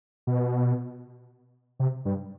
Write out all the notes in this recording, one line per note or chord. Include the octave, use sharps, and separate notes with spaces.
B2
C3
G2